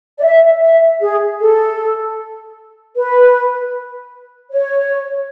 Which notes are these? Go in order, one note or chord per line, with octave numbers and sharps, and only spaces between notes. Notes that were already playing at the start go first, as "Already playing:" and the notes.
D5
E5
E5
G#4
A4
B4
C#5